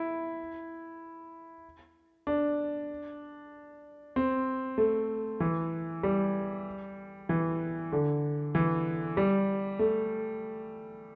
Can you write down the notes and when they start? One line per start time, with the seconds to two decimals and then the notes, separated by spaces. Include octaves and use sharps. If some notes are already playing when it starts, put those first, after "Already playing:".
Already playing: E4
2.27 D4
4.16 C4
4.78 A3
5.40 E3
6.03 G3
7.29 E3
7.92 D3
8.55 E3
9.17 G3
9.79 A3